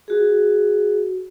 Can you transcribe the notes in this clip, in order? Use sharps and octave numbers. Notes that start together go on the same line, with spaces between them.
F#4 G#4